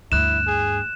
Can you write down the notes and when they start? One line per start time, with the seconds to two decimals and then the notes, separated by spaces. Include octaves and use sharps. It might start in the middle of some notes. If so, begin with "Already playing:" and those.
0.12 D2 G2 E4 F#6 E7
0.47 G#4